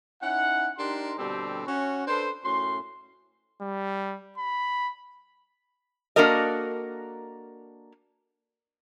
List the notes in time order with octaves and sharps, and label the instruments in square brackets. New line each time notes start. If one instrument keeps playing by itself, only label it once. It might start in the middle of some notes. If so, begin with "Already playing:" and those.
[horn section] C#4 D#4 E4 F#5
D4 D#4 G4 A#4 C6
B2 D3 G3 C4 G4 A4
C#4 F#4
D4 A4 B4 C5
F#2 A2 C#4 C6
[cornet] G3
B5
[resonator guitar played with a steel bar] A#3 D4 F#4 A4 A#4 D#5